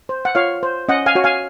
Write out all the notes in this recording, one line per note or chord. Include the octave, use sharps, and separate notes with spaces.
C5
F#5
F4 C#5 F5
C5
C#4 D#5 F#5
F5 G#5
F#4 C#5
F5 G#5